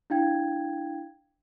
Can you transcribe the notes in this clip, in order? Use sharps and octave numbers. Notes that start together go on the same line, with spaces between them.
D4 E4 F5 G5 G#6